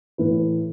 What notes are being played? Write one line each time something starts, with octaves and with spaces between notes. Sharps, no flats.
A2 E3 A3 E4 B4